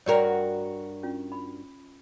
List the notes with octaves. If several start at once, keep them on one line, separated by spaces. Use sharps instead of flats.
G2 F#4 A#4 C#5 D5 G5
C#4 F4
B5